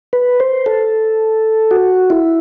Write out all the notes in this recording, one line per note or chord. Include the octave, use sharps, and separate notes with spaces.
B4
C5
A4
F#4
E4